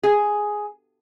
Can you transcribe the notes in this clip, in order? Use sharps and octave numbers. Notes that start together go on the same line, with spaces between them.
G#4